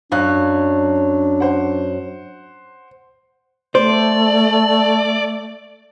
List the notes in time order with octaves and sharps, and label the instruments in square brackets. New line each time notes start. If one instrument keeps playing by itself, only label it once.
[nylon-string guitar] F#2 F#3 [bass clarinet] D4 [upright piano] F5 F#6
[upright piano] C5 F#5
[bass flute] A3 [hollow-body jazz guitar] C5 [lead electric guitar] D5